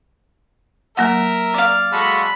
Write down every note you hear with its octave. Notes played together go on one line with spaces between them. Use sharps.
F#3 A#3 A#4 E5 F#5
D5 F5
G#3 F#4 A4 B5